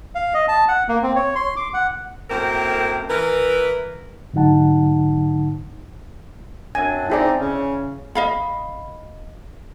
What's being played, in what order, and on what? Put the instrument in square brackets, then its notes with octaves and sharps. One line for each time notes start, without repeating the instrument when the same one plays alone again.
[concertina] F5
D#5
A5
F#5
A#3
C4
C#5
C6
D6
F#5
[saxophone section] F#2 A2 A#3 C4 A#4 C5
E3 A#4 B4
[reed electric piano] G#2 D3 F#3 D#4 F#5 A5
[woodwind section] F#2 C4 D4 [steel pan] G#5
[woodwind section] C4 D#4 [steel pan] E4 G#4 D5
[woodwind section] C#3 C#4
[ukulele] D#5 F5 B5